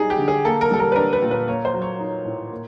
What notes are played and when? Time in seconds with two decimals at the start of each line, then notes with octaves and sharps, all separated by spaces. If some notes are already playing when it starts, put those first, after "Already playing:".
Already playing: G3 D#4 G#4
0.10 G4
0.18 D3
0.28 G#4
0.45 A#3 A4
0.61 A#4
0.71 G3 A4
0.80 A#4
0.92 B4
0.96 D4 A#4
1.13 B4
1.22 A#2
1.31 B4
1.48 A#3 C#5
1.65 C5
1.74 F#3
1.82 C#5
1.99 D#4
2.25 A2
2.52 A#3